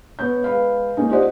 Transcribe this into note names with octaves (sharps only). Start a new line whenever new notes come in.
B3 C#5 G6
G#3 B4 F5
G#3 A#3 C#4 D#4
F4 G4 C5 D5 D#5 F#5